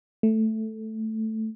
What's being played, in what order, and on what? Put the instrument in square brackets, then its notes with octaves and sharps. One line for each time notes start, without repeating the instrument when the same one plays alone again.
[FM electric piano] A3